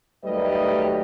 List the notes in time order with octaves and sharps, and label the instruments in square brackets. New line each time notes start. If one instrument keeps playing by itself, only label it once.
[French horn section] D#2 F#3 G3 A3 B4 D#5